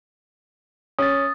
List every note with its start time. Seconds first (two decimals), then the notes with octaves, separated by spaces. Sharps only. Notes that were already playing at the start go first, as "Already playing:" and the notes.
0.99 C#4 D#6 A6